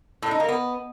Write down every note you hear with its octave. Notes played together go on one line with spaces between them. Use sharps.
A2
D#4
A#3
B3